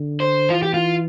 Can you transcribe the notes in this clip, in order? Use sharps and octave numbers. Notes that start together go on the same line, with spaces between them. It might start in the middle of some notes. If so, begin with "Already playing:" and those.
Already playing: D3
C5
E3 F4
G4
F4